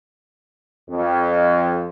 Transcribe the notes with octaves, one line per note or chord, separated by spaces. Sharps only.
F2